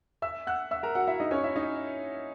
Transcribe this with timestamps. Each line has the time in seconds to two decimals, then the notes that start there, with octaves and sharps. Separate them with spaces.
0.22 E5 E6
0.47 F#5 F#6
0.71 E5 E6
0.83 A#4 A#5
0.95 F#4 F#5
1.07 E4 E5
1.20 D#4 D#5
1.31 C#4 C#5
1.44 E4 E5
1.56 D#4 D#5